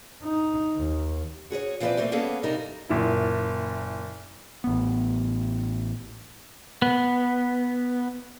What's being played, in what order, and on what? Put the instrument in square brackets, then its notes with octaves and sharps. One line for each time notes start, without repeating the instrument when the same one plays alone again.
[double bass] D#4
D#2
[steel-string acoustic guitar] F#4 G#4 B4 C#5
E3 F3 B3 C4 B4 D5
G3 A3 A#3 C4
G3 A#3 B3 C#4 G#4 A4
G2 C3 G3 D#4 A#4
[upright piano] F#1 A#2 E4
[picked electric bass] A1 B3
[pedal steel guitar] B3